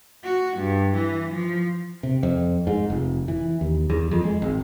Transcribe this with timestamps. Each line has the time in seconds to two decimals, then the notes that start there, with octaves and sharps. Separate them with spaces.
0.24 F#4
0.57 G2
0.95 E3
1.31 F3
2.03 C3
2.23 F2
2.67 G#2
2.90 F1
3.28 E3
3.61 D#2
3.90 E2
4.11 F2
4.24 G#3
4.42 G#1